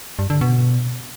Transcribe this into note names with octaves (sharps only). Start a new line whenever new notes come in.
G2
D3
B2